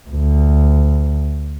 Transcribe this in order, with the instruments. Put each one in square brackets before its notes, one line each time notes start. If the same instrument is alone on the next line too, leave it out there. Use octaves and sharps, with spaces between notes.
[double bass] D2